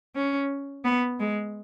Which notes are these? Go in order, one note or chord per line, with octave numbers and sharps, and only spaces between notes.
C#4
B3
G#3